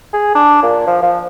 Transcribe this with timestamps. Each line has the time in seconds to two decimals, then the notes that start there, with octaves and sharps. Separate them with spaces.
0.13 G#4
0.35 D4
0.63 A#2
0.87 F3
1.03 F3